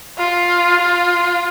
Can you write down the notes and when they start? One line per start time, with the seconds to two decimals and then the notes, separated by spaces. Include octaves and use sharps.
0.18 F4
0.81 F4